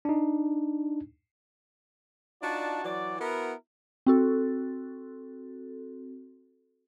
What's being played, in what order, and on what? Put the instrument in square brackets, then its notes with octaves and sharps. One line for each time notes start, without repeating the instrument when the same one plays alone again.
[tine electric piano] D4 D#4
[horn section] D4 D#4 F4 F#4 D5 A5
E3 F#3 F#4 D5
B3 E4 F#4 A#4
[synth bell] C4 F#4 A4